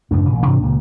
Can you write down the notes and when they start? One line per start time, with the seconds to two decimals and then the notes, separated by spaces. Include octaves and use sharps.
0.11 F#2 A2 C#3 D4
0.29 A1 A#2 C#3
0.46 G#2 C3 E3 D4
0.62 C#2 A#2 C#3